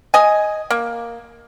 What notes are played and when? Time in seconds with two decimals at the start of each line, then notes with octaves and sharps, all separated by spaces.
0.14 D#5 G#5
0.70 A#3